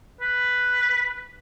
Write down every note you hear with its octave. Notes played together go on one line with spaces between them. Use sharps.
B4